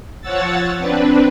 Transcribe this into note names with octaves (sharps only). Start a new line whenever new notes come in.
F3 C#5 F#5 E6 A6
C4 D4 B4